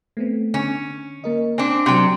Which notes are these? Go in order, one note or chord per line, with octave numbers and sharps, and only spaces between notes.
A3 B3 C4
D3 C#4
A#3 A#4 D#5
C4 D4 G#5
C3 F#3 G5 F#6